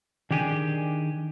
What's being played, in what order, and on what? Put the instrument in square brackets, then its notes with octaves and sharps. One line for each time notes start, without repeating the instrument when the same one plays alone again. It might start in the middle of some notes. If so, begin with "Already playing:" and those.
[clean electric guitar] D#3 D4 G4 G#4 G#5